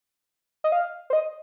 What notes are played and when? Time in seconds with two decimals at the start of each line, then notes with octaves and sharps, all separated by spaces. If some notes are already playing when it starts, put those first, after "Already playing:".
0.64 D#5
0.72 F5
1.10 C5
1.13 D#5